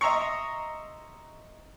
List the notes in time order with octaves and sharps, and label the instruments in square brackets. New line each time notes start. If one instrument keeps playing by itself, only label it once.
[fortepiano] D#5 E5 A#5 C6 C#6